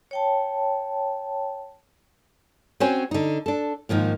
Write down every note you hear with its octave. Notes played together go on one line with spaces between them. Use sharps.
C#5 G5 A5
C4 C#4 F#4 C5 C#5 G#5
D3 D#4
D4 A4
G#2 D#3 F3 A#3